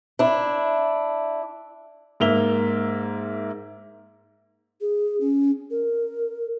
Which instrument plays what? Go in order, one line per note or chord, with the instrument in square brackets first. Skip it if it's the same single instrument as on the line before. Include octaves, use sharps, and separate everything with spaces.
[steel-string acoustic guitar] D4 E4
[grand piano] G#2 A#3 E5 F7 G7
[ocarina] G#4
C#4
A#4